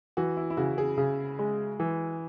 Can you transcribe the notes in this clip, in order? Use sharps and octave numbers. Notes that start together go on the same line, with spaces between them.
E3 F#4
E4
E4
C#3 F#4
G#4
C#3
G#3
E3